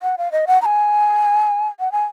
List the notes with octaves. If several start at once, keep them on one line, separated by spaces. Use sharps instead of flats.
F#5
F5
D#5
F#5
A#5
G#5
F#5
G#5